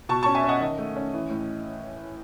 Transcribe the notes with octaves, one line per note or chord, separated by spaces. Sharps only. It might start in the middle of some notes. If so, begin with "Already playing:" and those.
B2 A5 C#6
C#4 A5 C#6
E5 G#5
C#4 D#5 F#5
D#3 D#5
A3
C#4
E3
A2